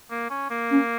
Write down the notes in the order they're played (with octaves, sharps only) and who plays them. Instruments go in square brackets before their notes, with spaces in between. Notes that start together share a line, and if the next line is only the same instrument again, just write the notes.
[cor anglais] A#3
C#4
A#3
[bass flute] C#4